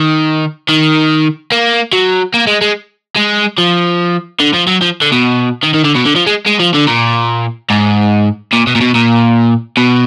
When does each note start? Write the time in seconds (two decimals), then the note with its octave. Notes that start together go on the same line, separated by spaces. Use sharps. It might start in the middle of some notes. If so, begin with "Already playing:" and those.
Already playing: D#3
0.69 D#3
1.52 A#3
1.93 F#3
2.34 A#3
2.47 G#3
2.62 G#3
3.16 G#3
3.58 F3
4.40 D3
4.54 F3
4.67 F#3
4.81 F3
5.02 D3
5.12 B2
5.64 D#3
5.74 D#3
5.85 D3
5.95 B2
6.06 D3
6.16 F3
6.27 G#3
6.47 G#3
6.60 F3
6.75 D3
6.87 A#2
7.70 G#2
8.53 A#2
8.67 B2
8.76 A#2
8.81 B2
8.95 A#2
9.77 B2